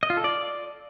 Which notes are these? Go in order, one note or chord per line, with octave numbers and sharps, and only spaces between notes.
D#5
F4
A4
D5